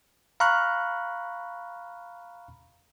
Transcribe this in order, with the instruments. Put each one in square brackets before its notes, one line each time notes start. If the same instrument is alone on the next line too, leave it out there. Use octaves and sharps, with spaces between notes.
[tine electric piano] F5 A#5 B5 C#6 F6 F#6